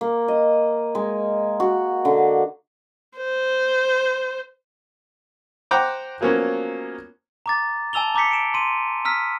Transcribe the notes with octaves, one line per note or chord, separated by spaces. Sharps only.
A#3
D#5
G#3
F#4
D3
C5
C5 F#5 G5 A#5 D6
F3 F#3 A#3 B3 C#4
A#5 D6 A6
G#5 A5 E6 F7 G7
A#5 D6 G6 B6 C#7
D7 E7
C6 D#7
A#5 E6 F6 B6